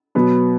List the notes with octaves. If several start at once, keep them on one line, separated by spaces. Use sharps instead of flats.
B2 F#3 B3